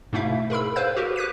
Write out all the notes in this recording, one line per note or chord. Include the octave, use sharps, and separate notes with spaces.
G#2 B2 A3 E4 E5 F5
G#4 A#4 B5 E6
B4 C5 F5 E6 F#6 G6
F#4 G4 A#4 B4
D6 F#6 B6 D#7